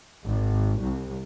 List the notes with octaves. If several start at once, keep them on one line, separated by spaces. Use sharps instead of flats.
G#1
C2